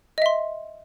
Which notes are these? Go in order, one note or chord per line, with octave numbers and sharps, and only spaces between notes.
D#5 E5 C6